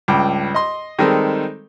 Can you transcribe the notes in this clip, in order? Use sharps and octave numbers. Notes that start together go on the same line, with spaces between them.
C#2 G2 G5 D6
D#5 C6
D#3 G3 G#3 C4 D#4 A4